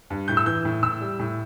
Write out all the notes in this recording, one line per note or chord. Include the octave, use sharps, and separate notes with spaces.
G2
A2 G6
E6
E3 G6
A2
A2 E6
G3
A2